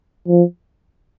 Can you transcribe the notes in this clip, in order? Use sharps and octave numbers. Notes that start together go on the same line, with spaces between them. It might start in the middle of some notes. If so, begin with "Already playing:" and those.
F3